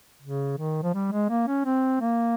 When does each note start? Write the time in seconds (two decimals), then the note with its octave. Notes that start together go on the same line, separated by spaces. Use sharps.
0.23 C#3
0.58 D#3
0.83 F3
0.95 G3
1.12 G#3
1.29 A#3
1.48 C#4
1.66 C4
2.01 A#3